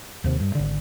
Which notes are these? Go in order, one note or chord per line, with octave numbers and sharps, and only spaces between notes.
D#2 C3
G2
G#1 D3